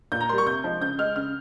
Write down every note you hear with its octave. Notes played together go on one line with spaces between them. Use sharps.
A#2 G6
A#5
G3 A#3 C6
C#6
C3 G6
F3 G#3
C#3 G6
G#3 F6
C#3 F6